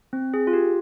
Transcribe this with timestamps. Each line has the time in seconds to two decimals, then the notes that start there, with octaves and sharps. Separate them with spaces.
0.13 C4
0.34 G#4
0.47 F4
0.53 G4